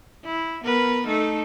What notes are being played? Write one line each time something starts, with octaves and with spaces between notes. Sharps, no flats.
E4
B3 A#4 B4
A3 D#4 A4